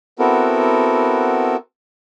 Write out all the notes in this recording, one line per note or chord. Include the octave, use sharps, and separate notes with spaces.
B3 C4 E4 F#4 A4 A#4